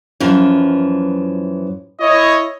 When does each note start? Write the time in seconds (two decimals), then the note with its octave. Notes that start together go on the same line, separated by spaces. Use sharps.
0.20 F#2 E3 F3
2.01 E4 C#5 D#5